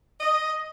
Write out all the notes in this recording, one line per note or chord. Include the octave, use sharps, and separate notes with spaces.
D#5